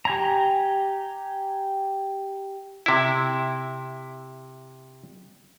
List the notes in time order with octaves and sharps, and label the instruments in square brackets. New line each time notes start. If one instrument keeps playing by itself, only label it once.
[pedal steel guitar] G4 G#5 A#5
[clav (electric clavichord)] C3 E4